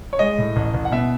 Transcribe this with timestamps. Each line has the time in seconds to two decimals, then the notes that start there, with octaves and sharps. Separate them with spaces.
0.13 C#5
0.19 G#3 D#5
0.38 A2
0.56 A1
0.74 A1
0.85 F#5
0.92 B2 E5